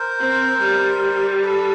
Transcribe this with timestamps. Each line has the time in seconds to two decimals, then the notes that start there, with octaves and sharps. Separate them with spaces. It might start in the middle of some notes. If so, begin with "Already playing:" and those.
Already playing: A#4 C5
0.20 C4
0.61 G3
1.43 A4 B4